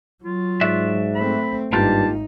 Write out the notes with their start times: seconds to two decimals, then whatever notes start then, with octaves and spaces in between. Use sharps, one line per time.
0.24 F#3 F4
0.61 G#2 F#4 D5 E5
1.15 A3 C4 B5
1.73 G#1 G2 A#3 D#4 F4 G4 A5